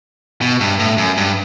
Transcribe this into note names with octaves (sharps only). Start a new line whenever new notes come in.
B2
G2
A2
F#2
G2